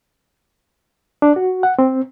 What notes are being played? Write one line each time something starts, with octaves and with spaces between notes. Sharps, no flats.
D4
F#4
F#5
C4